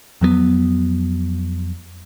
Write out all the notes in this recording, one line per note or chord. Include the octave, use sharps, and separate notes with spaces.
F2 F#3 G#3 B3